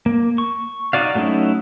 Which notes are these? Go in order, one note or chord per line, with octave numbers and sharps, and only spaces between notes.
A#3
C#6
D#4 F#4 D5 F5
F#3 A3 C#4 D#4 E4